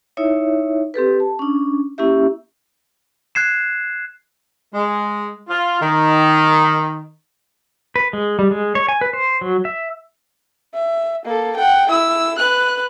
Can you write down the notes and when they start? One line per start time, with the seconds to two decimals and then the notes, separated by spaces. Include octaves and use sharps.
0.17 D#4 E4 C#5 E5
0.94 C4 G4 A4 B4
1.20 A5
1.39 C#4 D4
1.98 A#3 C#4 E4 G4 E5
3.35 F#6 G#6 C7 E7
4.75 G#3
5.50 F4
5.82 D#3
7.96 B4
8.13 G#3
8.39 G3
8.51 G#3
8.75 C#5
8.88 G#5
9.01 B4
9.13 C5
9.41 F#3
9.65 E5
10.74 E5
11.25 A#3 A4
11.56 F#5 G5
11.89 E4 E6
12.38 B4 F#6